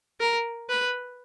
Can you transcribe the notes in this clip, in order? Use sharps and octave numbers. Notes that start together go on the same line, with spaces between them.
A#4
B4